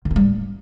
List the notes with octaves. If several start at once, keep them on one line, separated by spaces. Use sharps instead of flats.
D#3
B3
G3
A2